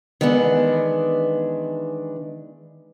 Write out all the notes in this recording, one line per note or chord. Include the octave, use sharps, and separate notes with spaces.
D#3 E3 G#3 B3 D4